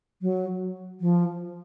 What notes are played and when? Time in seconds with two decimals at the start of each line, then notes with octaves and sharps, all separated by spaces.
0.22 F#3
1.01 F3